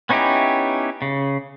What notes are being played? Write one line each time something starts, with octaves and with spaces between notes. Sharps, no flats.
B3 C#4 D#4 E4 G4
C#3